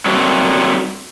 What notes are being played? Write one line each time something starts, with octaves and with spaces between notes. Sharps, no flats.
F#3 G3 A3 A#3 C4 F#4